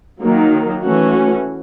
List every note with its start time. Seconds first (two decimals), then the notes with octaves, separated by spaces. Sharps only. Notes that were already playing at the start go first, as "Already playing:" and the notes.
0.22 D#3 F#3 A#3
0.82 E3 A3 C#4 F#4